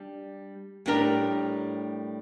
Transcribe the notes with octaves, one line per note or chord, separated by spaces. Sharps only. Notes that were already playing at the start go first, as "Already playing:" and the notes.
Already playing: G3 D4
A2 G3 D4 G4 A#4